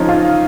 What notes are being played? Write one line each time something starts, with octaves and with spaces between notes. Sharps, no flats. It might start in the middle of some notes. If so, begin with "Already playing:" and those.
Already playing: C#3 F3 C#4 D#4
F4